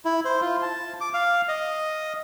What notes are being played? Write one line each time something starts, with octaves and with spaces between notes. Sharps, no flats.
E4
C5
F4
A5
D6
F5
D#5